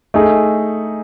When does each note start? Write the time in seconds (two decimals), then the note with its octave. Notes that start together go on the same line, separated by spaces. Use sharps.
0.14 A3 D#4 G#4